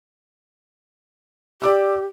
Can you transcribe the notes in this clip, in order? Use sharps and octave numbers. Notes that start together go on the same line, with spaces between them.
G4 D5 D6 E6